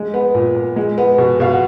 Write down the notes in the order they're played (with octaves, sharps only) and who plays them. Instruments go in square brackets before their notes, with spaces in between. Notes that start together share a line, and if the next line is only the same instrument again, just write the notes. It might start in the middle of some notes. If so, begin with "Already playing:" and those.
Already playing: [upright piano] G#3
B3
A#2
A#2
G#3
B3
B2
B2 F5
F#5